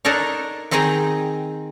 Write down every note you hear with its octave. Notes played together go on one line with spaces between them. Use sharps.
D4 D#4 A4 A#4 C#5
D#3 C4 D#4 G#4 G5 A#5